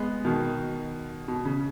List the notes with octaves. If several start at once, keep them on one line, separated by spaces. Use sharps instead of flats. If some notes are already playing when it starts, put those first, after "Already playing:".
Already playing: G#3 B3
B2 D#3
B2
C#3